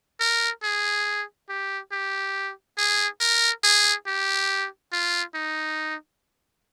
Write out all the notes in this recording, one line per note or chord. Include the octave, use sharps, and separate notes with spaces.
A#4
G#4
G4
G4
G#4
A#4
G#4
G4
F4
D#4